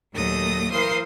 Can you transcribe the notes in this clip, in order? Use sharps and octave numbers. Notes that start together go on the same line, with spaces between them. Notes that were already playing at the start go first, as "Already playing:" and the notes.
D#2 A#2 F#3 A3 D#6 A#6
E3 A#4 C5 F5 C6 D#6